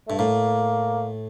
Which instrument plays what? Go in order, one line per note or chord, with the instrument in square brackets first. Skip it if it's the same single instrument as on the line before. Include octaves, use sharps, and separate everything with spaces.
[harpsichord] G2 [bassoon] A3
[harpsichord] A2 [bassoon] A#3